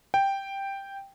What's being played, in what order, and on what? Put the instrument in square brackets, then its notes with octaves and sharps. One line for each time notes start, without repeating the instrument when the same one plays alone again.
[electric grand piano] G5